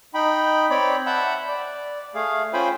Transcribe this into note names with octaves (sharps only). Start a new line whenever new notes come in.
D#4 G5 B5
C4 C#5 D5 G5 B5
E5 F#5 A5 B5 E6 G6
D5
A3 G#4 F5
C#4 F4 C5 G5 G#5 B5